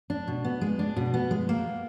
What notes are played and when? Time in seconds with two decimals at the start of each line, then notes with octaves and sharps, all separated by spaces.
0.10 D4
0.28 B2
0.44 B3
0.61 G#3
0.79 D4
0.96 B2
1.14 B3
1.31 G#3
1.49 A#3